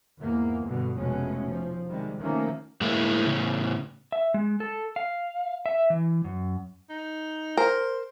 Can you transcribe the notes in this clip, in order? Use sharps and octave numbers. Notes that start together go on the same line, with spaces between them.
E2 G#2 A#3
G2 B2 D3
F1 B2 G#3 A3 C#4
F3
C3 D#3 G3 G#3
C3 D#3 F3 A3 A#3 C#4
A2 G#3 A#3 E4
A2 C#3
E5
G#3
A4
F5
E5
E3
F#2
D#4
A#4 C5